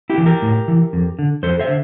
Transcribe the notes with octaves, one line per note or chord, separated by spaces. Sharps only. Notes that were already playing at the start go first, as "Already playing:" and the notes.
E4 G4
E3
G4 A#4
A2
E3
F2
D3
F2 A4 C5
C5 E5
D3